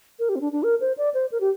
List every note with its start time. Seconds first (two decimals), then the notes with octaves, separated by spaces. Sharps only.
0.19 A#4
0.29 G4
0.36 C4
0.41 D4
0.52 D4
0.63 A#4
0.80 C5
0.98 D5
1.14 C5
1.32 A#4
1.40 G4